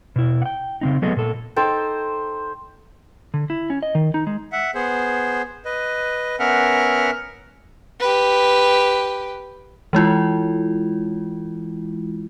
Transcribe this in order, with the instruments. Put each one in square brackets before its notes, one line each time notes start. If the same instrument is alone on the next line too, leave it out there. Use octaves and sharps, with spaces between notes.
[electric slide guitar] B2 E4
F#5 G5
C#3 C4 D#4
F#3 A3 B3 G#4 A4 D#5
A#2 A4
[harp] D#4 A4 G5 [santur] C5
[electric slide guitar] D3
E4
C#4
D#5
D#3
D#4
G#3
[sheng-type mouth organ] E5 F#5
B3 G#4 C5
B4 D#5
B3 C#4 A#4 E5 F#5 F6
[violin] G4 B4
[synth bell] E3 G#3 E4 F4